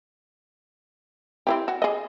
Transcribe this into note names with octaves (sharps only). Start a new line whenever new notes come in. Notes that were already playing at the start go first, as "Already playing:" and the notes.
C4 E4 G4
F#4
G#4 D#5